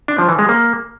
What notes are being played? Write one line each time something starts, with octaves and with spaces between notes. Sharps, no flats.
D4
F3
E3
G#3
A#3